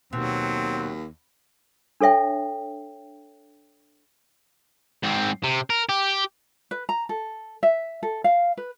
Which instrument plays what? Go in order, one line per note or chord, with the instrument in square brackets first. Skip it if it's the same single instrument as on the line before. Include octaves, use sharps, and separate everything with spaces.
[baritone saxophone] D#2 [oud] B2 [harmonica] F#3 [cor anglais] C4
[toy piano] D4 A4 C#5 E5 G5
[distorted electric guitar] G#2 C4
C3
A#4
G4
[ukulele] B4
A#5
A4
E5
A4
F5
B4